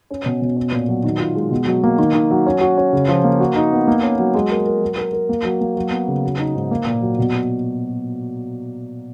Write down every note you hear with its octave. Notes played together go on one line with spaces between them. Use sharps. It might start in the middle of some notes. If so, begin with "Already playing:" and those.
C#4
B2
B2
C#4
A#2
F#3
D#3
F4
G#3
B2
F#3
A#3
D#3
D#3
F#3
C#4
F#4
C#4
C#3
F3
A#3
F#4
D#4
B3
A#3
C#4
F#3
G#3
A#4
A#4
F#3
A#4
A#4
A#3
F#3
A#3
F#3
B3
C#3
F#3
D#4
G#2
A#3
A#2
F#3
B2